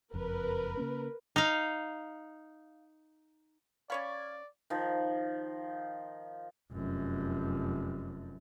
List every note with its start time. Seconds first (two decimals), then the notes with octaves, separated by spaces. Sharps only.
0.14 F#1 F2 A#4 B4
0.77 C#3 A#3 C#4
1.36 D#4 F5
3.90 C#4 C#5 D5 F5 B5 G#6 A6
4.70 D#3 F3
6.71 F1 F#2